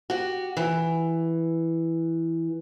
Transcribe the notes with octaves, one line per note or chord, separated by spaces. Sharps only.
F#4 G4
E3